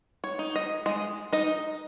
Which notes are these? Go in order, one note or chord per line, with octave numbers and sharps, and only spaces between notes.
C#5
D#4
D#5
G#3 D#5
D#4 D#5